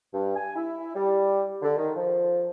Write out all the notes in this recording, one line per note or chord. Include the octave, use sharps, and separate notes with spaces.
G2
G#5
E4
G3
D3
D#3
F3